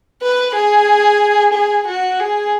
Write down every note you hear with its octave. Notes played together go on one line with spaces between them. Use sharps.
B4
G#4
G#4
F#4
G#4